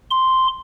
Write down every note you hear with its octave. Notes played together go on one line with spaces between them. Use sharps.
C6